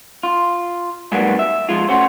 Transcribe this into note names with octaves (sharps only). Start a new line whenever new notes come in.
F4
G#2 B2 F#3 G3 A#3 B3
E5
F3 G#3 F4
A3 C#4 F#4 C5